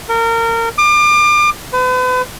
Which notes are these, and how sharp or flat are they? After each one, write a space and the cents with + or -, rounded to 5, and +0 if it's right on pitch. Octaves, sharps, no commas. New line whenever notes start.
A#4 -25
D6 +35
B4 +40